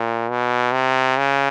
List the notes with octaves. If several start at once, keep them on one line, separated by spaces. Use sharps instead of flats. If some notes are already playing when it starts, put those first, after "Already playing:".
Already playing: A#2
B2
C3
C#3